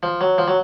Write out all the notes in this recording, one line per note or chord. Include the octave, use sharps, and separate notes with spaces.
F3
F#3
F3
F#3